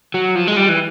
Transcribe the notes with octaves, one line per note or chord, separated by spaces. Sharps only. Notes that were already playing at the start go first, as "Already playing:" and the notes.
F#3
F3
G#3
G3
E3